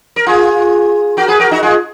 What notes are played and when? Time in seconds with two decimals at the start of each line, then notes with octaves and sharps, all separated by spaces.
0.16 A#4
0.27 F4 G#4
1.17 F#4 A#4
1.28 G#4 B4
1.40 F#4 A#4
1.51 D#4 F#4
1.63 F4 G#4